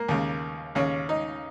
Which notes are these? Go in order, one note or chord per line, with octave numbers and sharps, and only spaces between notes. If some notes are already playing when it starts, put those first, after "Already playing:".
Already playing: A#3
D#2 C#3
D#2 C#3 C#4
D#4